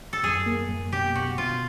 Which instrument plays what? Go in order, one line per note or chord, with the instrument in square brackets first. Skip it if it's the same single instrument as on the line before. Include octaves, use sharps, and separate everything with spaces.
[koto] A4
[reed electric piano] F#2 [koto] G#4
[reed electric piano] A#3
F#2
[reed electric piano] B2 [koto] G4
[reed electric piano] B2 [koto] F#4
[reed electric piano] B2 [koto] F4